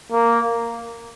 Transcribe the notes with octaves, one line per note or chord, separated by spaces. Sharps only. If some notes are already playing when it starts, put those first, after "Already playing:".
A#3